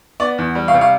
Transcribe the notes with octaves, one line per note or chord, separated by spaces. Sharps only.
B3 D5
E2
G3
F5
C3
F5